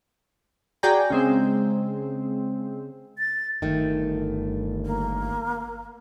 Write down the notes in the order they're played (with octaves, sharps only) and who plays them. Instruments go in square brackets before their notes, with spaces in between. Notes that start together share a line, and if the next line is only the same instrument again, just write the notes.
[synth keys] F#4 G#4 D5 G5 G#5 A#5
C#3 G#3 C4
[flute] A6
[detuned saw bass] G1 [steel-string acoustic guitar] D#3 A3
[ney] A#3